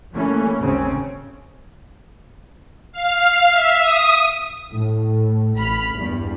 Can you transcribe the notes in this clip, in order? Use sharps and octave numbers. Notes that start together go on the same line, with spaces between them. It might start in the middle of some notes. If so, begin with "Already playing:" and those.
E3 G3 A3 A#3 C#4
G#1 D#2 C#3 C4 C#4
F5
E5
D#6
A2
A1 B5 F6 B6
E2 G2